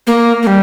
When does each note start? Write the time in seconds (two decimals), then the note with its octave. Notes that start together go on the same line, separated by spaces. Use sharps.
0.07 A#3
0.43 A#3
0.47 G3